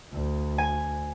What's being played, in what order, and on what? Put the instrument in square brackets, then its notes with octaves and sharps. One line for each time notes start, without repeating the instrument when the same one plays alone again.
[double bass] D2
[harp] G#5